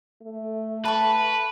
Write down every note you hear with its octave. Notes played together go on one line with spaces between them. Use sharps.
A3
B4 A5 C#6